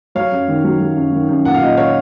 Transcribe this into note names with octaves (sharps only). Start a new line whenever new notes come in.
F#3 C#5 F5
F#2
D#3
F#3
F#3
F#2
D#3
F#2
A#2 F#5
F5
A#2 D#5 F#5
C#5 F5